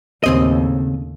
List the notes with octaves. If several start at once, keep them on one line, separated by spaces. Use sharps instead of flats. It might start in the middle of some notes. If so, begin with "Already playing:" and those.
D#2 A2 C#3 C4 D#5